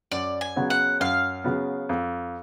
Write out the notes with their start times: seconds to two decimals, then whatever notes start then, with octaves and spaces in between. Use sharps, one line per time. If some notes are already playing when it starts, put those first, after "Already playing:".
0.11 F#2 D5
0.41 G#5
0.56 C#3 F#3 B3
0.70 F#5
1.00 F#2 F5
1.44 C#3 F#3 B3
1.89 F2